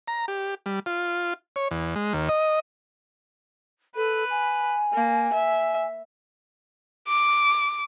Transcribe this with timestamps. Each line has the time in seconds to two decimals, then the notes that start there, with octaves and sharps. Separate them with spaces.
0.08 A#5
0.28 G4
0.66 G3
0.86 F4
1.56 C#5
1.71 E2
1.96 G#3
2.13 D#2
2.29 D#5
3.96 A4 B4
4.30 G#5
4.93 A#3
5.33 E5
7.08 D6